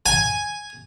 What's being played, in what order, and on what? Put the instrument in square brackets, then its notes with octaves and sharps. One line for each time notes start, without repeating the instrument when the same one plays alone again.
[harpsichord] G#5